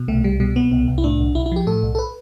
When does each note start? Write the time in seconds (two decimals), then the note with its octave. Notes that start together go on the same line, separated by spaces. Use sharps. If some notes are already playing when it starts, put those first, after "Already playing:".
Already playing: B2
0.08 C2 A3
0.24 C2 G3
0.40 B2 G3
0.56 B2 B3
0.71 C2 B3
0.88 C2
0.98 E4
1.04 A2 D4
1.20 B1
1.35 B1 E4
1.46 E4
1.52 F3 G4
1.67 A2 A4
1.83 B1
1.95 A4
1.99 B4